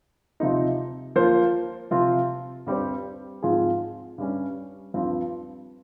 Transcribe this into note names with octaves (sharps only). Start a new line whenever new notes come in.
C3 F3 C4 D#4
F3 A#3 F4 C5
C3 F3 C4 F4
G2 G3 C4 G4 C5
G#2 F3 C4 F4 G#4
G2 G3 C#4
G2 F3 C4